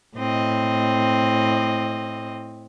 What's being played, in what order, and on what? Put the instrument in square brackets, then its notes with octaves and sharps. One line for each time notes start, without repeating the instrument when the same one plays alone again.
[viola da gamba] A2 C4 D#5